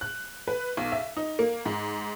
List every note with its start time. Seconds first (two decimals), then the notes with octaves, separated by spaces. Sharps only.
0.01 F#6
0.48 B4
0.77 B1
0.92 E5
1.17 D#4
1.39 A#3
1.66 G#2